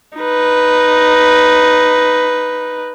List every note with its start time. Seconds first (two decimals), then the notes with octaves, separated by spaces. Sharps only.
0.18 D#4 B4